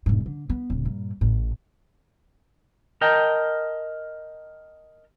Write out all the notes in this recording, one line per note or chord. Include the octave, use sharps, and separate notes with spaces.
E1 G#2
D3
B3
D1 C#2
G2 A#2
A1 A2
A#4 D#5 G5 A5 A#5